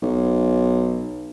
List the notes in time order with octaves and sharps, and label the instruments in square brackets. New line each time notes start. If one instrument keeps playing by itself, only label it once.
[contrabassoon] B1